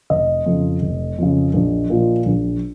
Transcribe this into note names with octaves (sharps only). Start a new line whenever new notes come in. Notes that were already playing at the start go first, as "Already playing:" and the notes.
F1 D#5
F2 C#3
F1
F2 C#3
A#1
A#2 F3
A#1